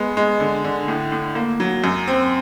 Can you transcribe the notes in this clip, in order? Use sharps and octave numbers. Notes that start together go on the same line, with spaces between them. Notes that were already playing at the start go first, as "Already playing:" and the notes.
Already playing: G#3 B3
G#3
D3
D3
A2
A2
A#3
F#3
F#2
C4